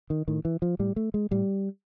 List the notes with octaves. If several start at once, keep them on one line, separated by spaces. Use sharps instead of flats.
D#3
A2 D#3
E3
F3
A2 G3
A3
G#3
A2 G3